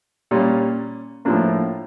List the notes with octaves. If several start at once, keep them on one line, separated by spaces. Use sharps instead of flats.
A#2 G3 A#3 C#4
A2 F3 A#3 D4